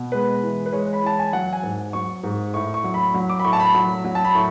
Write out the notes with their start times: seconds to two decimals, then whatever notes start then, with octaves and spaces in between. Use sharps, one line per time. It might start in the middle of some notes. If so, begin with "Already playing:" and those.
Already playing: B2
0.12 G#3 B4
0.43 E3
0.66 B4
0.73 G#3 C#5
0.93 B5
1.03 E3 A5
1.19 G#5
1.33 F#3 F#5
1.53 G#5
1.63 G#2
1.93 F#3 C#6
2.23 G#2
2.54 A2 C#6
2.74 C#6
2.84 F#3
2.94 B5
3.14 F#3
3.29 D6
3.39 B5
3.44 A2 C#6
3.53 A5
3.60 B5
3.74 F#3
4.05 F#3
4.15 A5
4.25 B5
4.35 A2 C#6